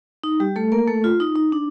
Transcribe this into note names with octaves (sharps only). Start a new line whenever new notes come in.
D#4
G3 G4
A3 A4
A#3 A#4
A3 A4
F4
D#4
D#4
D4